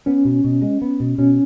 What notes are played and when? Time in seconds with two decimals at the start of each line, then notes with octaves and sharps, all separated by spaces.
0.06 B3 C#4
0.25 B2
0.44 B2
0.62 G#3
0.82 B3
1.00 B2
1.18 B2 C#4